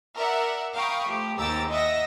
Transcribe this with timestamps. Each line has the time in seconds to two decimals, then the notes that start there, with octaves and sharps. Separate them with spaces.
0.16 A#4 D5 E5 F#5
0.74 F5 G5 A#5 B5 C#6 D#6
1.07 F3 A3 G4
1.37 D#2 G#2 G4 A#5 E6 A6
1.70 D#5 E5 F#5 E6 A#6